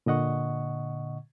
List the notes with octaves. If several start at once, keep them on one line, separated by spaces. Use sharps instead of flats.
A#2 D3 D#5 F#5 C#6